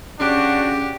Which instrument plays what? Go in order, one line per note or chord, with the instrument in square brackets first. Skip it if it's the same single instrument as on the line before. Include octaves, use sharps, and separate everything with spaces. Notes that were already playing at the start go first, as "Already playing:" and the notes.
[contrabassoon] C#3 [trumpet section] D4 F#4 [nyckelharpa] G4